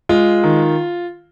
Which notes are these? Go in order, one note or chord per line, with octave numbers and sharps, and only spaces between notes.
G#3 F4
D#3